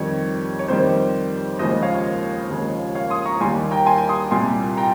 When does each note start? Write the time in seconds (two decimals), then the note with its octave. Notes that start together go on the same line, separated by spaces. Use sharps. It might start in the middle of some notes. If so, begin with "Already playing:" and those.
Already playing: F2 D#3 G3 C#5
0.59 C#5
0.68 F2 D#3 G3 C5
1.59 D#2 C#3 F3 G#3 C5 D#5
1.82 C#5 F5
2.50 D#2 C#3 F3 G#3
2.95 C#5 F5
3.10 C6 D#6
3.26 A#5 C#6
3.41 D#2 D#3 G3 G#5 C6
3.71 G5 A#5
3.86 G#5 C6
4.09 C6 D#6
4.31 C2 A#2 G3 G#5 C6
4.77 G5 A#5